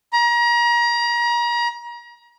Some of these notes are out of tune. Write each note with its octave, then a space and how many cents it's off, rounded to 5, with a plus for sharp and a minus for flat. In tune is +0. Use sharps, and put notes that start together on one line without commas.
A#5 +35